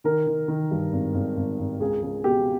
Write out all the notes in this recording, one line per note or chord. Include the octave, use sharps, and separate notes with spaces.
D#3 A#4
D#3
D#3
G2
G#1
G#1
G#1
G#1
C#2 G#4
C#2
B2 G4